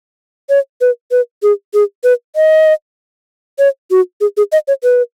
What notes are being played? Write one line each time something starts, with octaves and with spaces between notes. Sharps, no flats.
C#5
B4
B4
G#4
G#4
B4
D#5
C#5
F#4
G#4
G#4
D#5
C#5
B4